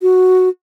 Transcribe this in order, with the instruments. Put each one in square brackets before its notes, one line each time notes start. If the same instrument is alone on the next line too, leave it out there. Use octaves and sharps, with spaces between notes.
[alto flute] F#4